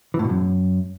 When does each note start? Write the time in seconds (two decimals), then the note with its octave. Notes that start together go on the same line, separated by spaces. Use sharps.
0.14 E3
0.19 A2
0.24 B2
0.29 F#2